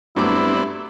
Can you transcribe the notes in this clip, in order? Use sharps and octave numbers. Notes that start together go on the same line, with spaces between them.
G2 F#3 A3 B3 C4 D4 E4 D6